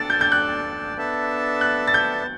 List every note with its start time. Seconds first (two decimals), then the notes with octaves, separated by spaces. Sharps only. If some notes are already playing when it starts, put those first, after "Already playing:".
Already playing: D4 A4 D5 A5 A6
0.10 G6
0.21 G6
0.32 F#6
0.96 B3 D4 A4 E5 A5
1.61 F#6
1.88 A6
1.94 G6